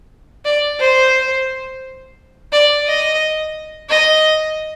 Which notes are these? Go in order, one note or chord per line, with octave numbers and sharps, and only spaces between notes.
D5
C5
D5
D#5
D#5